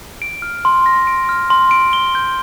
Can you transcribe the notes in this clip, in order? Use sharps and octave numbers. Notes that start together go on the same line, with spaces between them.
D7
F6
C6
A#6
D7
F6
C6
D7
G7
G6